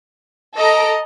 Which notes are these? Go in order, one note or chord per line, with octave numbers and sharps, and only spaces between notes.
A4 D#5 A#5 D7